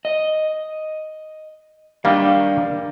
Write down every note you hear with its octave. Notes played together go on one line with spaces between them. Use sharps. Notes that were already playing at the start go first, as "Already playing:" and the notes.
D#5
D#3 G3 A#3 D4 F5